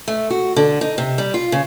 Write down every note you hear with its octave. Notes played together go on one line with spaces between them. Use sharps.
A3
F#4
D3
D#4
C3
G3
F4
C#3